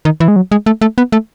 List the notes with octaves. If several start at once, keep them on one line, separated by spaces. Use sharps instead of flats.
D#3
E3
G#3
F#3
G#3
A3
A3
B3
A3